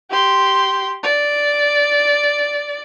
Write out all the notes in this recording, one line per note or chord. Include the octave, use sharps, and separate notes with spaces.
G4 C6
D5